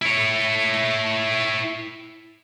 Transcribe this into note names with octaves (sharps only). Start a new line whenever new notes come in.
E4 C#5